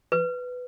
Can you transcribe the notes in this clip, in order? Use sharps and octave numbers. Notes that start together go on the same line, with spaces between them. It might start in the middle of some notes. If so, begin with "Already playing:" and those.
B4